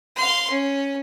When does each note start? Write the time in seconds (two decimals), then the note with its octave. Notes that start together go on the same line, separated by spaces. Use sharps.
0.16 F5 C6
0.50 C#4